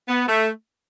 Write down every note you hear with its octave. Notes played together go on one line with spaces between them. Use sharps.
B3
A3